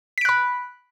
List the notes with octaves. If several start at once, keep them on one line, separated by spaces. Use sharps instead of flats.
B5 F#6 B6 D7